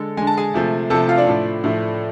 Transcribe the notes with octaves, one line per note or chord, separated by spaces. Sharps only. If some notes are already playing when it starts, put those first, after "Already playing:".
Already playing: D3 G#3 A4 A5
D3 G#3 G#5
A5
G#4 G#5
C3 F3 A3
C3 F3 A3 A4 A5
F4 F5
D4 D5
A2 F3 A3
A2 F3 A3